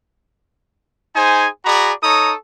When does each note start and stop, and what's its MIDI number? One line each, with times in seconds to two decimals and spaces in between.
1.16 1.48 63
1.16 1.48 68
1.16 1.48 72
1.16 1.48 80
1.65 1.92 66
1.65 1.92 68
1.65 1.92 74
1.65 1.92 82
1.65 1.92 83
2.02 2.33 63
2.02 2.33 69
2.02 2.33 73
2.02 2.33 82
2.02 2.33 87